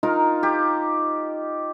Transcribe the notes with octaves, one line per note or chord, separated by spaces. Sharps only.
D#4 F4 A#4
G4